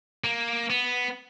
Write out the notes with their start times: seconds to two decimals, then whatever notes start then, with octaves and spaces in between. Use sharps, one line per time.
0.24 A#3
0.70 B3